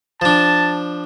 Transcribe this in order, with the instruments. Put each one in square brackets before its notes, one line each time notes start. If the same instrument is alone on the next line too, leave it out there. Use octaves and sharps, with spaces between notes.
[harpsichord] F3 D4 [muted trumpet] A5